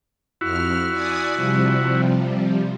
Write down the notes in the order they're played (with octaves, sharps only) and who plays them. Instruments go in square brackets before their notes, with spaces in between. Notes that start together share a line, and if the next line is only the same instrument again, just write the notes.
[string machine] F2 F6 [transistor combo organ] E4 F#4
[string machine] D5 G#5 D#6
C3 F3 G3